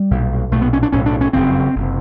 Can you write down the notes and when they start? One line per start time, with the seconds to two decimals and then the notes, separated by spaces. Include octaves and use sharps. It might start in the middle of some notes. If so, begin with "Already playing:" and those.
Already playing: G3
0.11 B1 A#2
0.51 B1 A#2 A3
0.62 B3
0.73 C#4
0.83 D4
0.92 B1 A2 C#4
1.06 D4
1.21 C#4
1.33 F#1 F2 C#3 C4
1.75 F#1 C3